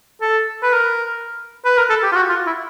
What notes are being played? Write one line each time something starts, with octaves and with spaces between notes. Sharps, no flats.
A4
B4
A#4
B4
A#4
A4
G4
F4
F#4
F4
E4